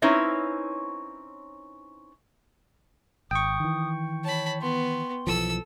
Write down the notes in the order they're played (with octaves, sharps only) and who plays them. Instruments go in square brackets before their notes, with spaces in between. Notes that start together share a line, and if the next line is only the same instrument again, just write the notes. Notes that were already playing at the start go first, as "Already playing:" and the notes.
[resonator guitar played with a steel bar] C4 C#4 D#4 E4 B4 C#5
[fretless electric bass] G#1 [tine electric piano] G5 C#6 [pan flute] D#6
[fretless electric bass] D#3 E3
[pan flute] C#5 [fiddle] A5 B5
[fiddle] B3 [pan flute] C6
[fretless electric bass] B1 E3 F3 [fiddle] A4 E6